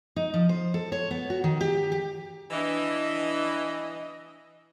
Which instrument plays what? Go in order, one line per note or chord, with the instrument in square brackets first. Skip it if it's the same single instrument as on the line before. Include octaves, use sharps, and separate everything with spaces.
[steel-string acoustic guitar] D#4
F3
C5
A4
C#5
B3
F#4
D#3
G4
G4
[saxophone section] E3 [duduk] D4 [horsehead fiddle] D#5